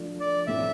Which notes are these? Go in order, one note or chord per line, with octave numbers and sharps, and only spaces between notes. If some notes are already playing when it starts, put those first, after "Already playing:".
Already playing: F3 A3 D4
D5
A2 F3 A3 C4 E4 E5